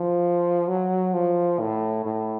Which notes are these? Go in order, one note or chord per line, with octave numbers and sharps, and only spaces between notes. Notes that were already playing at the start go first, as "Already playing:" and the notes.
Already playing: F3
F#3
F3
A2
A2